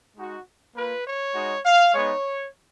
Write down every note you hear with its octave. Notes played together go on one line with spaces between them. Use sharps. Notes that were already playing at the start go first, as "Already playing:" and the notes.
G#3 D#4 F#4
A#3 F4 B4
C#5
G#3 D#4 F#4
F5
G#3 B3 D#4 C#5